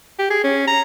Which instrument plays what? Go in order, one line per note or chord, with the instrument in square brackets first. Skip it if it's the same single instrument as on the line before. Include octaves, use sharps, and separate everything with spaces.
[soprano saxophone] G4
G#4
C#4
A#5